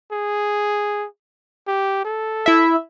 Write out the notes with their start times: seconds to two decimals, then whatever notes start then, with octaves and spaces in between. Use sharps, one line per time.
0.12 G#4
1.68 G4
2.05 A4
2.46 E4 E5